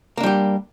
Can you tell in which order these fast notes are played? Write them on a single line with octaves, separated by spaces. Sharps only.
A#3 D4 G3 G4